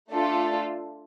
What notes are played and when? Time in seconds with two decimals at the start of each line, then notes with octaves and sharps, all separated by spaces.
0.11 A3 D4 F4 A4